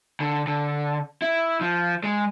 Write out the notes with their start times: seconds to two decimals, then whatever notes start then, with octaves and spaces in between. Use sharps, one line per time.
0.20 D3
0.47 D3
1.22 E4
1.61 F3
2.04 G#3